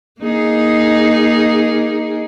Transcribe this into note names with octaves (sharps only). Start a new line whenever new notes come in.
A#3 D#4 G#4